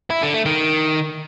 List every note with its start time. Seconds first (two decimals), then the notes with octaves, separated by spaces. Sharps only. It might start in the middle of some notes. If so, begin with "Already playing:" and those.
0.10 E4
0.22 D3
0.34 A3
0.46 D#3